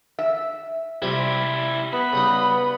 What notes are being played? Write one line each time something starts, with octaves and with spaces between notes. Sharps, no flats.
E5
C3 G3 E4 F4 G4
B3 B5
C#3 G3 D#4